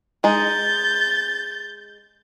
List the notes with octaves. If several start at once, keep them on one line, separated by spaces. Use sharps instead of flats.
G#3 D#4 G6 A6